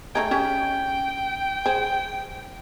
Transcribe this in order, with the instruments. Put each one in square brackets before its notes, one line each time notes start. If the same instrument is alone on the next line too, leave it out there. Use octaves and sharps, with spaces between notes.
[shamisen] A3 D#4 G#4 [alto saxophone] G5
[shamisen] C#4 G4 G#4
G#4 C5